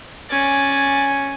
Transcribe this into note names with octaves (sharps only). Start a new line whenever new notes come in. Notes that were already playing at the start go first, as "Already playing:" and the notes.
C#4 D5 G#5